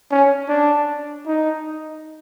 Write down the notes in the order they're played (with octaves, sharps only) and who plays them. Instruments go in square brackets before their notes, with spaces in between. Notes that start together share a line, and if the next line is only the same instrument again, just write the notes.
[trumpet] C#4
D4
D#4